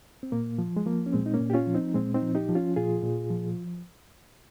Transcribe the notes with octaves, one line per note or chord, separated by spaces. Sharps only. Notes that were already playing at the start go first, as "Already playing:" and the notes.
C4
A#2 A#3
F3
G#3
F3 A#3
C#4
A#2 G#3 C4
D#4
A#3 C#4
A#2
G4
C#4 F4
F3
C4 D#4
A#2 G#3 C4
C4 D#4
F3
D#4 G4
F3
C#4 F4
A#2 F4 G#4
A#2
F3